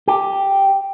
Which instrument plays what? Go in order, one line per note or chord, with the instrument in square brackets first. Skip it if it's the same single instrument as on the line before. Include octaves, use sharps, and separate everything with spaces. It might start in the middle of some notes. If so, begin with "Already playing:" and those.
[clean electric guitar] G4